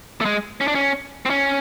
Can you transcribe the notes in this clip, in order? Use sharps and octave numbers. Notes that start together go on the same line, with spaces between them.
A3
G#3
C#4
D4
C#4
C4
C#4